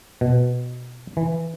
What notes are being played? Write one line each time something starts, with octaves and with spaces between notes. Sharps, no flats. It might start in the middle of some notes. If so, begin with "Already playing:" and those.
B2
E3